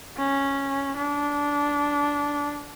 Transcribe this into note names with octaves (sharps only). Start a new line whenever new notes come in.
C#4
D4